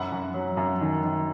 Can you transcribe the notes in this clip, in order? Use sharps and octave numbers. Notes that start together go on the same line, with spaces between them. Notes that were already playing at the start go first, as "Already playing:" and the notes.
Already playing: F#2 F#5 B5
F#2
F#3
F#2
D#3
D#3